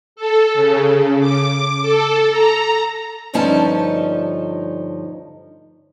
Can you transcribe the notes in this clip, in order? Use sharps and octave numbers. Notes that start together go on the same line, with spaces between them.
A4
C#3
D6
A4
A#5
D2 G2 F3 C#4 D#4 A5